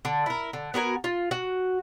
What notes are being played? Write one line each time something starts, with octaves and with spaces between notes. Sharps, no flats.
D3
E4 A#4
D3
B3 F#4 A#4 G#5
F4
F#4